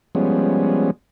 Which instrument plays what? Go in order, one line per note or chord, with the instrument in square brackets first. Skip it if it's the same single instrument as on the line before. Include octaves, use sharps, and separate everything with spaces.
[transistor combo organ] F3 G3 G#3 B3 C#4